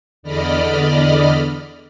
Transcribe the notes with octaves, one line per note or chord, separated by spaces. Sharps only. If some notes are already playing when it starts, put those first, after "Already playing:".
E2 D3 D5 D#5 B5 F6